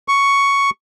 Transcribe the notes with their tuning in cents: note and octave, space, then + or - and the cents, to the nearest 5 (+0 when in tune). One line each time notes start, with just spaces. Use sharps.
C#6 +5